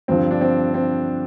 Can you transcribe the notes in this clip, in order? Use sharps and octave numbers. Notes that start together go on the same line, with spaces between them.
G2 D3 F3 C4
D4
C4
C4